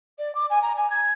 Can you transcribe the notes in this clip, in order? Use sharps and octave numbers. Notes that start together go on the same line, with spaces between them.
D5
D6
G#5
A#5
G#5
G#6